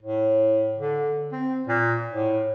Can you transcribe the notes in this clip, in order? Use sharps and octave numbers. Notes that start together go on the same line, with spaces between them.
A2
D3
C4
A#2
A2